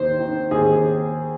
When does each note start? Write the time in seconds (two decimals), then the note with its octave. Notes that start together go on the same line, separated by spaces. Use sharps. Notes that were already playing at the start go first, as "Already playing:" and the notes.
Already playing: D#2 D#3 C5
0.19 D#3
0.51 D#2 G#4